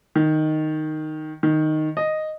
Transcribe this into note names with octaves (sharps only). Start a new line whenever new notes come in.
D#3
D#3
D#5